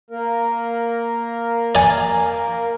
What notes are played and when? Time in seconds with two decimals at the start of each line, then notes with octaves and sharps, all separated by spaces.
0.11 A#3 A#4
1.75 D5 G#5